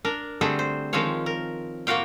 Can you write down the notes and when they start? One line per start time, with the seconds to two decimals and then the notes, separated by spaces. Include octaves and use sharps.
0.05 D4 A#4
0.41 D3 G3 A3 C4 G#4
0.59 C5
0.93 D#3 F3 G#3 C4 F4 C#5
1.26 A#4
1.87 A2 A#3 F4 F#4 F5 G5